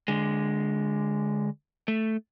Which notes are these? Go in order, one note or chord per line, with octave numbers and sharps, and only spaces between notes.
D3 G#3
A3